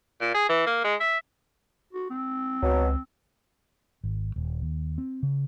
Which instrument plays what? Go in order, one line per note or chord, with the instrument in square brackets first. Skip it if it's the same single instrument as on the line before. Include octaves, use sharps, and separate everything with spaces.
[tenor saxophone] A#2
G#4
E3
A#3
G#3
E5
[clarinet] F#4
C4
[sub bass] C#2 [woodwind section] B2 F#3
[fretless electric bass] G#1
D#1
D#2
C4
C#3